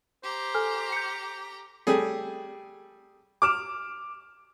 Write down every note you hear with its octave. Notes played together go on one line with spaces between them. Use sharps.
G4 C5 A#5
A4 G#5 F6
G6 C#7
G3 A3 G#4
D6 F6 E7